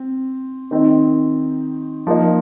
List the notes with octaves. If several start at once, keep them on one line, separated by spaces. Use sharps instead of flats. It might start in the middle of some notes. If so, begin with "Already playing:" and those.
Already playing: C4
D#3 C4 D#4
F3 A#3 D#4